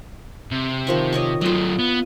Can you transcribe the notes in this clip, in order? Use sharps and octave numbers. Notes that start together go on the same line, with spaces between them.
C3
D#3 F3 C#6
C#5 D#5 C#6
F#3 A3 F4 D#5
B3